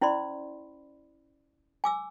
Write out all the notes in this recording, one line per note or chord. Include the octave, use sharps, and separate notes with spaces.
C#4 E4 C5 D5 B5 C6
G#5 D6 E6